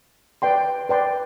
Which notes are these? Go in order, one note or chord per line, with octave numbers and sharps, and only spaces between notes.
B4 D5 G5 C6
B4 D5 G5 C6